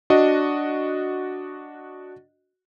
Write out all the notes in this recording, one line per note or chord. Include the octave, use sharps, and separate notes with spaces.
D4 F#4 D#5